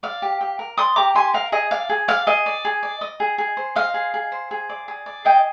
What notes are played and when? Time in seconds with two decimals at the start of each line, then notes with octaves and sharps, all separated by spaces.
0.03 D5 F5
0.22 G4
0.41 G4
0.59 A#4
0.77 D5 C6 D#6
0.96 G4 A#5 D6
1.15 G4 G#5 C6
1.34 A#4 F5
1.52 G#4 D#5
1.71 D5 F5
1.89 G#4
2.08 D5 F5
2.27 G#4 D#5
2.46 D5
2.65 G#4
2.83 D5
3.01 D#5
3.20 G#4
3.38 G#4
3.57 C5
3.75 D#5 F5
3.94 G#4
4.14 G#4
4.32 C5
4.51 G#4
4.69 D5
4.88 G#4
5.06 D5
5.25 G#4 D#5 G5